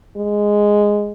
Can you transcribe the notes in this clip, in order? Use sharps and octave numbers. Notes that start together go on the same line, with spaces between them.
G#3